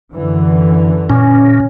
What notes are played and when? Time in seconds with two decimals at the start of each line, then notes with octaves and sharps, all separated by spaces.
0.12 F#2 D3 E3
1.10 A#2 C#4